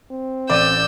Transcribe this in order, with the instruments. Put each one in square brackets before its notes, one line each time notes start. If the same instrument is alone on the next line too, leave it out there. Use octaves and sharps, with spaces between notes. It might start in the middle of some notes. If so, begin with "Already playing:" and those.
[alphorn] C4
[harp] A1 D#7 [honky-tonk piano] D5 [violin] E6 G6